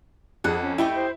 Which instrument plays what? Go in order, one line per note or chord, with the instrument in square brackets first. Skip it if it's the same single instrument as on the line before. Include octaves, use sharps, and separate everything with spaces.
[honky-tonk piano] F2 [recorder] G#4 [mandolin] F#5
[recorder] C#4
[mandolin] A3 G4 D#5 [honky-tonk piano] E4
[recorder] C5